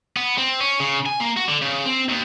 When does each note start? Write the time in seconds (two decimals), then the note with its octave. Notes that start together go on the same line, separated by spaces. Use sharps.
0.16 B3
0.38 C4
0.61 C#4
0.80 C#3
1.06 G#5
1.20 A#3
1.37 F#4
1.49 D3
1.62 C#3
1.86 C4
2.09 D#2